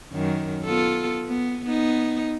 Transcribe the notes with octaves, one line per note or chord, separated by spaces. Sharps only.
F#2 D#3
B3 F4 A4
B3
B3 D#4